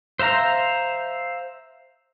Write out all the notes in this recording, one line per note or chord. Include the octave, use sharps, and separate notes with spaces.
C5 E5 F5 A#5